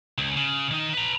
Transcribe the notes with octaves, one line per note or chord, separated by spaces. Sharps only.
C#2
C#3
D#3 D#4
B4 A#5